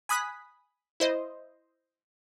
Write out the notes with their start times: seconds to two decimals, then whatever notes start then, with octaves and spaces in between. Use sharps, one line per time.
0.09 G#5 B5 D#6 F#6 B6
1.00 E4 C5 D#5